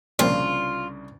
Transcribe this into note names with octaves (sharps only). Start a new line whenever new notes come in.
C2 A#2 C#3 F3 C4 D4 F4